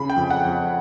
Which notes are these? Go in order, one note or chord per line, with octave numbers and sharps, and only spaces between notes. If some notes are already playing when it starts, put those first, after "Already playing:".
Already playing: C#3 B5
G5
F2
F#5
F2